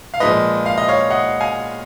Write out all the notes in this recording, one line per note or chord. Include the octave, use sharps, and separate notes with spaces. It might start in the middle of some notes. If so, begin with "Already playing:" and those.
F5
A#2 F3 G#3 B4 D#5
F5
D#5
C#5 F5
D#5 F#5
F5 G#5